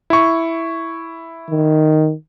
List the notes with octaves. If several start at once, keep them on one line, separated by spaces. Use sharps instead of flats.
E4 C#6
D#3